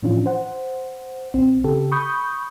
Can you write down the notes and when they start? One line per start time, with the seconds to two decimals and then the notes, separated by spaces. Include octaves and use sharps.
0.02 A2 E3 F3 C#4 D4 F4
0.26 C5 F#5
1.34 A#1 C4
1.64 C#3 G4 A4
1.91 B5 C#6 D#6 G6